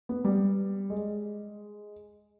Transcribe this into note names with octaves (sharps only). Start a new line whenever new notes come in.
B3
G3
G#3